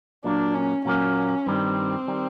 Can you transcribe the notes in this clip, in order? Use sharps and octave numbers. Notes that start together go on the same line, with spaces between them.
A#2 F#3 A#3 D4
C#4
A#2 F#3 A#3 C#4
G2 D#3 G3 C4
D#3 G3